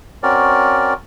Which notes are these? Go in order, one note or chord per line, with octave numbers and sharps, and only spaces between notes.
C4 C#4 F#4 A#4 D5